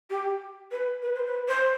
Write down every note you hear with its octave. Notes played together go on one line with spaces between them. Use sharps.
G4
B4
B4
C5
B4
C5